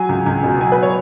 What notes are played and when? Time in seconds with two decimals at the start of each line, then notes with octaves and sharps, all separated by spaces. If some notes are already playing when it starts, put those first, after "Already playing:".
Already playing: F#3 G#5
0.09 C#2
0.26 C#2
0.43 B2
0.61 F#3 G#5
0.72 B4
0.83 C#5